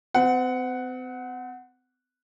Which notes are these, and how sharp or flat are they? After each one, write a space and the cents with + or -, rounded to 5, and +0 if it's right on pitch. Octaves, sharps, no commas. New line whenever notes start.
C4 -40 F#5 +0